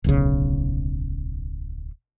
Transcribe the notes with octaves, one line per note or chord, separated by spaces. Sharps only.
D1 B1 C#3